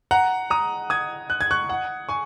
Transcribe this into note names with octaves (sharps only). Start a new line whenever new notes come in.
F#5 A#5
A#5 D#6
D#6 G#6
F#6
G#6
C#6 F#6
F#5
G#5 C#6